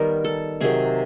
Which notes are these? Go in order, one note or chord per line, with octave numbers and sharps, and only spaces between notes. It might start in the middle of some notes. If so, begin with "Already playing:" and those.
Already playing: D#3 G3 B3 A#4
A4
C3 D#3 F#3 G#4